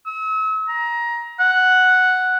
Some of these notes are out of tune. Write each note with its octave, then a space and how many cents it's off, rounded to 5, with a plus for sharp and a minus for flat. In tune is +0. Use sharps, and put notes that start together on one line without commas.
E6 -40
A#5 +20
F#5 +0